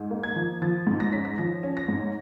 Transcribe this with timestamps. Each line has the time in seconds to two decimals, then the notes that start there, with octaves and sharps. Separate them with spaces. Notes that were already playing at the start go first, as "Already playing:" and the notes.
Already playing: G#2
0.11 A#3
0.23 G#6
0.36 F3
0.62 F3 A6
0.87 G#2
1.00 A#6
1.12 C#4 B6
1.25 A#6
1.38 F3 A#6
1.63 C#4
1.77 A#6
1.88 G#2